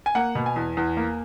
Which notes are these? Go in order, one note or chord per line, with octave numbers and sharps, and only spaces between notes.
G#5
A#3 F#5
B2
G#5
E2
E2
A#3